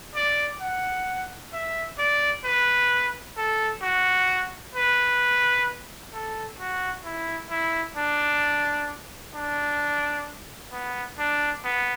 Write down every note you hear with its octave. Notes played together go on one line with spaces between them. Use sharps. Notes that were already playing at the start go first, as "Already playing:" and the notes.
D5
F#5
E5
D5
B4
A4
F#4
B4
A4
F#4
E4
E4
D4
D4
B3
D4
B3